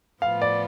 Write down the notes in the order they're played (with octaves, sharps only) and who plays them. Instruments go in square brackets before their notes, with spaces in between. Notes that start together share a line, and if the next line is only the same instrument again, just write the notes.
[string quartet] A2 F3 B3 F4 [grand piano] F5
[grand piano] D5